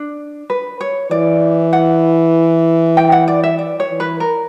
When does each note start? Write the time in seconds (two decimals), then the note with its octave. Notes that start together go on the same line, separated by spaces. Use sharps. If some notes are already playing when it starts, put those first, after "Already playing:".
Already playing: D4
0.50 B4
0.81 C#5
1.11 E3 D5
1.73 F#5
2.97 G5
3.12 F#5
3.28 D5
3.43 E5
3.59 D5
3.80 C#5
3.90 E3
4.00 B4
4.20 A#4